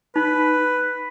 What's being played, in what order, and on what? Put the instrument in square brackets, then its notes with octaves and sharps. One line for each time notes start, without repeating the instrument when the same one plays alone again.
[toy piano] D#4 [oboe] B4